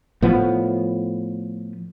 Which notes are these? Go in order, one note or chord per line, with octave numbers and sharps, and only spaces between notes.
A2 F3 B3